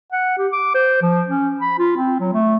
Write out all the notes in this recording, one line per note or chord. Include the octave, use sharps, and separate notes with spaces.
F#5
G4
D6
C5
F3
C#4
B5
F4
C4
F#3
A3